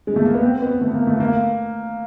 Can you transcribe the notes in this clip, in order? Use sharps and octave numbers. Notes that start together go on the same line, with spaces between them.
G#3
A3
A#3
B3
C4
B3
A3
A#3
A3
A#3